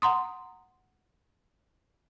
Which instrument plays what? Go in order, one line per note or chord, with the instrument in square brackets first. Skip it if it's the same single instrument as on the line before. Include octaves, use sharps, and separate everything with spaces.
[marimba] F#5 A#5 C6 D#6